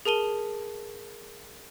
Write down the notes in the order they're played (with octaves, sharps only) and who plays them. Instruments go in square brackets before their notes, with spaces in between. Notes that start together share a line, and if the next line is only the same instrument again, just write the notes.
[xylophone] G#4 A#4 A5 D#7 G7